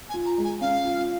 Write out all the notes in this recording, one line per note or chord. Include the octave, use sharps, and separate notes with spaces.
G#5
F4
A#5
G#3
G#5
C#4 F5
F4